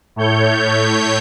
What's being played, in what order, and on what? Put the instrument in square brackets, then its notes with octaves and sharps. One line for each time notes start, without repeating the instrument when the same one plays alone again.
[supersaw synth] A2 A3 C#5 G6